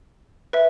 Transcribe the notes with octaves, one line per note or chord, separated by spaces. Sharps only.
B4 E5